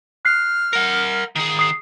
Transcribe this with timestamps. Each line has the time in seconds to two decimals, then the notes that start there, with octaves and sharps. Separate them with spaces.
0.25 F6 F#6 C7
0.73 A#4 F#5
1.36 D#3 G#4
1.59 D#6 C7